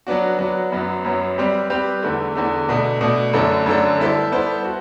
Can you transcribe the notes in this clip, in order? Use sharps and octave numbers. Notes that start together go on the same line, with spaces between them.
F#3 B3 D4 F#4
F#3 B3 D4 F#4
F#2 F#3 B3
F#2 F#3 B3
G3 C4 G4 B4
G3 C4 G4 B4
E2 D3 A3
E2 D3 A3
B2 A3 D4
B2 A3 D4
F#2 D3 A3 D4 A4
F#2 D3 A3 D4 A4
G3 B3 E4 A4 C5
G3 B3 E4 A4 C5
F#4